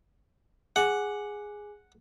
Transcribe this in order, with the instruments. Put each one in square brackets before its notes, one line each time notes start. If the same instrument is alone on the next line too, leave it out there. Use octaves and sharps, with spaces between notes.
[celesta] G#4 G#5 D6 [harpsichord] F#5